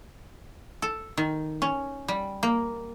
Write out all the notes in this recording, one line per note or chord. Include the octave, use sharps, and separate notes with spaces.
A4
D#3
C#4
G3
A#3